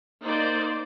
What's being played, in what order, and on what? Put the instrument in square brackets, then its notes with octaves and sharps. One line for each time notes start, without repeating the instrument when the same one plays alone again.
[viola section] A#3 D#4 C5 D5